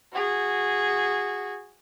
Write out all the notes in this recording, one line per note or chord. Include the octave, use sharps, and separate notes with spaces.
F#4 G#4